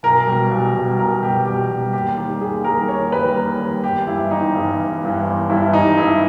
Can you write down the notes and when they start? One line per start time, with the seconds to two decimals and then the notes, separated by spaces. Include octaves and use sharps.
0.03 B1 A#4
0.27 B2 G3
0.51 B1
0.75 B2 G3
0.99 B1 A#4
1.22 B2 G3 G4
1.46 B1 G4
1.70 B2 G3
1.93 D#2 G4
2.17 D#3 G3
2.41 D#2 G#4
2.64 D#3 G3 A#4
2.88 D#2 C#5
3.12 D#3 G3 B4
3.36 D#2 A#4
3.59 D#3 G3
3.84 G1 G4
4.07 G2 E3 G3 E4
4.31 G1 D#4
4.55 G2 E3 G3
4.78 G1
5.02 G2 E3 G3
5.26 G1
5.49 G2 E3 G3 E4
5.73 G#1 D#4
5.97 G2 E3 E4